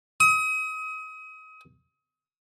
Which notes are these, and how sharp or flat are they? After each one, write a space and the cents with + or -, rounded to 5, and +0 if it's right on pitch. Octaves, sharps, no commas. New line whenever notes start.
D#6 +35